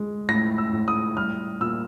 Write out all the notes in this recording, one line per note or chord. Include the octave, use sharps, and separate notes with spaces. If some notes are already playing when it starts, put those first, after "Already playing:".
Already playing: G#3
A2 A#6
E6
A2
D#6
G3 F6
A#2 E6